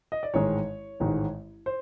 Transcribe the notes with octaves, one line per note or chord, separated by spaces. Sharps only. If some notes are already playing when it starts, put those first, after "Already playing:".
D#5
D5
A1 G#2 D#3 G#3 C#5
A1 G#2 D#3 G#3
C5